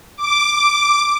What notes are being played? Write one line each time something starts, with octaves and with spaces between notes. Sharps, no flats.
D6